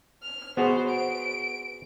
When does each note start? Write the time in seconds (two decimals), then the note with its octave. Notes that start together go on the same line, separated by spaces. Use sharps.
0.23 F6
0.57 B3 F#4 G#4 C5
0.90 D7